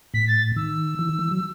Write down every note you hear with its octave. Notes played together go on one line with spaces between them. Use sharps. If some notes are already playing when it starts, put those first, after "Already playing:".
A2 B6
A6
D#3 E6
E3
D#3
E3
F#3